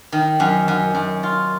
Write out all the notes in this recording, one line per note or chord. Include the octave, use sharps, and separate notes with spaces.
D#3
F#2
F#2
F#2
F4